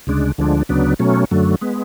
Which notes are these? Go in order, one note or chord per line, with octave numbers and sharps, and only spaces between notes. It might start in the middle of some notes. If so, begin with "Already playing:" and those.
D2 C#3 G#3 D4
D2 D3 F3 G#3 D4
D2 C#3 F#3 B3 D4
B2 F#3 A3 C#4
F#2 D3 F#3 A3
G#3 B3